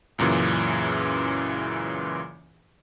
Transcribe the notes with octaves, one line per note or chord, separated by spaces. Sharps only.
C#2 F#2 A#2 C#3 E3